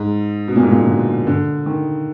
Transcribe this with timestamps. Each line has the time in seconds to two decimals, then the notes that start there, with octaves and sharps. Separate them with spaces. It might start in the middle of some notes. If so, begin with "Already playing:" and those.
Already playing: G#2
0.48 B2
0.56 A#2
0.63 G#2
0.71 A#2
0.82 D3
0.88 B2
1.27 D3
1.66 D#3